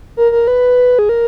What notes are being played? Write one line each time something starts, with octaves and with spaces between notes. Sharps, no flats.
A#4
A#4
B4
G#4
A#4